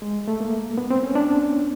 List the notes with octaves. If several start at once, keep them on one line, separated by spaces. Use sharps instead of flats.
G#3
A3
A#3
B3
C4
C#4
D4